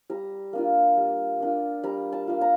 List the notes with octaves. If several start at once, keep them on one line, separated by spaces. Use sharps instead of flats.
G3 A#5
A#3 D4 F4
G3
A#3 D4 F4
G3 A#5
A5
A#3 D4 F4
A#5